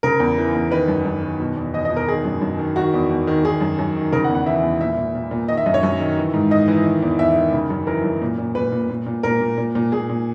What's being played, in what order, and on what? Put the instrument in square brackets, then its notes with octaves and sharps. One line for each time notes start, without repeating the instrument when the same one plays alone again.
[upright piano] C#3 A#4
E2
E3
E2
D#3 B4
F#2
F#2
D#3
B2
E2
E2 D#5
D#5
B2
A#4
D#3 G#4
F#2
F#2
D#3
D#3 F#4
E2
E2
D#3
D#3 G#4
F#2
F#2
D#3
C#3 A#4
F#5
E2
F#5
E3 E5
E2
A#2 E5
A#2
A#2
A#2
D#3 D#5
E5
F#2 D#5
C#5
F#2
D#3
E3
G#2
G#2 D#5
E3
D#3
E2
E2 E5
D#3
C#3
F#2
E3 A#4
F#2
A#2
A#2
A#2 B4
A#2
A#2
A#2
A#2 A#4
A#2
A#2
A#2
A#2 G#4
A#2